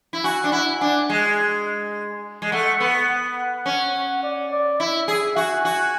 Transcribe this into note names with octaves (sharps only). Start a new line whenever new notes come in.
E4
F#4 G#5
D4
E4 F#5
D4 G#5
G#3
G#3
A3 F#5
B3
F#5
C#4
D5
D5
E4 E5
G#4
F#4 G#5
F#4